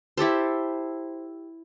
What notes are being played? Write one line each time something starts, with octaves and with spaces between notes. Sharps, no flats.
E4 G4 A4 C5